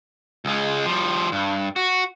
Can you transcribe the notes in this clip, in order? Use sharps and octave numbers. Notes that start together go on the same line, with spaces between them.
C#2 G#3
F3 G3
G2
F#4